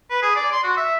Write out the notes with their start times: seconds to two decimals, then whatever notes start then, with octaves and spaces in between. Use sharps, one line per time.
0.10 B4
0.22 G#4
0.36 D5
0.52 C6
0.64 F#4
0.77 E5